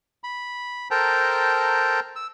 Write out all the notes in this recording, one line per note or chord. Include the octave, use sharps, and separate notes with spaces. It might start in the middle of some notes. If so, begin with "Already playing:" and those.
B5
A4 A#4 C5 G5 A5 A#5
E6